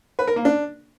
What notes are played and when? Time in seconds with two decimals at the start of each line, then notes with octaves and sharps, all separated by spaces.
0.19 B4
0.27 A#4
0.36 A#3
0.45 D4